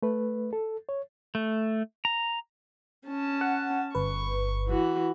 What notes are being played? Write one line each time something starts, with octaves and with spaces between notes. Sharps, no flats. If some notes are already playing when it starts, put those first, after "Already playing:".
A3 B4
A4
C#5
A3
A#5
C#4 A5
F#5
G1 B4 C#6
E3 F#4